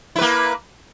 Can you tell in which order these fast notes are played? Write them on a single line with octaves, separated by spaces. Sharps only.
E4 B4 A#3